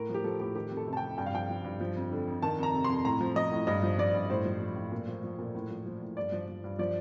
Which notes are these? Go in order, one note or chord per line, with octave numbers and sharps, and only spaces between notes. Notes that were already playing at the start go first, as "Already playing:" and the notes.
Already playing: A2 A#4
F3
G4
F3 A4
A2 G4
D#3 G4
F2
A4
C3
A5
G5
F2
G2 G5
F5
F3 G5
F3
G2
F3
F2
D3
F2
D#3 A5
F2 A#5
C3
F2 C6
A2 A#5
F3
F3 D#5
A2
G2 D#5
F3
F3 D5
G2
A2 C5
F3
F3
A2
A#2
F3
F3
A#2
A2
F3
F3
A2
G2 D5
F3
F3
G2
F3 D5